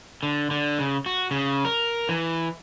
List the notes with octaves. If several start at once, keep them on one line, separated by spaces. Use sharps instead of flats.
D3
D3
C#3
F#4
C#3
A#4
E3